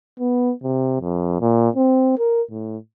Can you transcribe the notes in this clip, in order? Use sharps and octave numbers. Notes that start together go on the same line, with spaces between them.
B3
C3
F2
A#2
C4
A#4
A2